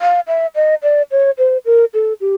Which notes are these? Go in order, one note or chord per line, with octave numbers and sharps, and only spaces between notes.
F5
E5
D#5
D5
C#5
C5
A#4
A4
G4